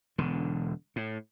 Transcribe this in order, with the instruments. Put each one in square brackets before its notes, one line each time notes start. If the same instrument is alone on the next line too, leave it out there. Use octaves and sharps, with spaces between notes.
[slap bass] E1 D3
A2